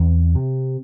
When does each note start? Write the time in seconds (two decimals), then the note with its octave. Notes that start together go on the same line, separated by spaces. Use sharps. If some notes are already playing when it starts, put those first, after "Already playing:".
Already playing: E2 C4
0.35 C3